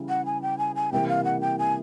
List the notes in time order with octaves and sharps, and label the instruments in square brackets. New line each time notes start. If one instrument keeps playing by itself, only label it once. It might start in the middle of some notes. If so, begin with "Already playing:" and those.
Already playing: [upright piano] C#3 E3 G3
[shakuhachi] F#5
G#5
G5
G#5
G#5
[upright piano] C3 E3 G3 A#3 [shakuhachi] G5
[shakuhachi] F5
F#5
G5
G#5